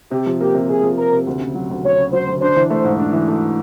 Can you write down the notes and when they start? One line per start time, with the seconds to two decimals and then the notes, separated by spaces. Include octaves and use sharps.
0.11 C3 G4
0.26 F3
0.40 A#3 G4
0.55 C3
0.69 C3 G#4
0.84 F3
0.97 A#3 A#4
1.12 C3
1.27 D2
1.41 C#3
1.55 F#3
1.70 D2
1.84 D2 C#5
1.98 C#3
2.13 F#3 C5
2.27 D2
2.41 D4 C5
2.56 E3
2.70 A3 C5
2.84 G#2
3.00 D4
3.13 E3
3.28 A3